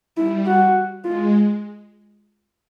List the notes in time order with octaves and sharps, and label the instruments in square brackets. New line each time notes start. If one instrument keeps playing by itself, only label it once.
[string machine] G3 [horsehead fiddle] E4
[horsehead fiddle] F#4
[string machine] G#3 [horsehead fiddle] F4